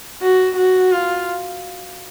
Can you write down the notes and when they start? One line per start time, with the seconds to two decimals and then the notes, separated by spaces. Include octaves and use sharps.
0.22 F#4
0.57 F#4
0.91 F4